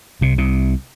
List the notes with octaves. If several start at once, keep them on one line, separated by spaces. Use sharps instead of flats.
C2 C3
C2 C3